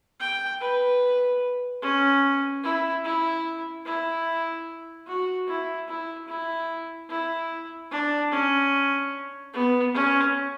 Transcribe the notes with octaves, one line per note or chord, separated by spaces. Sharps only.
G5
B4
C#4
E4
E4
E4
F#4
E4
E4
E4
E4
D4
C#4
B3
C#4